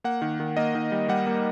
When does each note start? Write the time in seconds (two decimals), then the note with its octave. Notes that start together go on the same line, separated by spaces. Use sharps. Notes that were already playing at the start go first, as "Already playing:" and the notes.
0.04 A#3 F#5
0.22 D#3
0.40 D#3
0.57 A#3 D#5
0.75 D#3
0.92 G3
1.09 G3 F#5
1.27 A#3